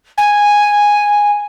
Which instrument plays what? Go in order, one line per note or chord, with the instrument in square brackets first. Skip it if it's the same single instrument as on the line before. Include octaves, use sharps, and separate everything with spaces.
[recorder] G#5